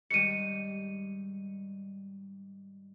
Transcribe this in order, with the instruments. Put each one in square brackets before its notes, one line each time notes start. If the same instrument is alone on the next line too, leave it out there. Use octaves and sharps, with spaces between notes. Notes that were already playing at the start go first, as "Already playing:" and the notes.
[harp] G#2 D#3 G3 [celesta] C#7 D#7